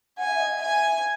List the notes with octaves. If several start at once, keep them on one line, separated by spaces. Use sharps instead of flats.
F#5 G#5
E5
D#5
F#5
E5
G#5